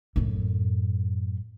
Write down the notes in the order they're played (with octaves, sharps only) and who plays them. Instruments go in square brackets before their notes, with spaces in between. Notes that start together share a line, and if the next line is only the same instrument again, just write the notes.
[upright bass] F#2 A2